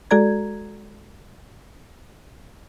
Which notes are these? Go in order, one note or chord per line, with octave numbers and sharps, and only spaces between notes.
G#3 F#4 A4 D5 A#5 G#6